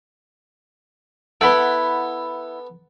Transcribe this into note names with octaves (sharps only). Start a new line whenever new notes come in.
B3 E4 A4 F#5 B5